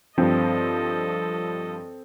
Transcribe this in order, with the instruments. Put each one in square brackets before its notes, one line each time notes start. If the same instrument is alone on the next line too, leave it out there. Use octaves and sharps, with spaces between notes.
[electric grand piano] G2 F3 [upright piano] C4 [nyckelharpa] A4 D#5